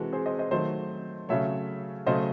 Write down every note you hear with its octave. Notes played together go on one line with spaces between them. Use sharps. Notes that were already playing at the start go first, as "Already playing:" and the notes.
Already playing: C3 E3 G#3 F#4 A4
G#4 C5
C5 D#5
C5 D#5
D#3 F#3 A3 C5 D#5
C#3 F#3 A3 C#5 E5
C#3 F#3 A3 C5 D#5